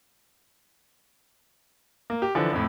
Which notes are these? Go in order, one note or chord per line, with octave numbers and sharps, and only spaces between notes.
A#3
G4
D3 E3 F3
F2 A2